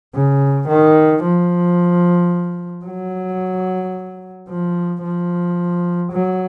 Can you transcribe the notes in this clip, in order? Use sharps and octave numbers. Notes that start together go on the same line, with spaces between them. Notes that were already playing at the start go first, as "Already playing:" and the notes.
C#3
D#3
F3
F#3
F3
F3
F#3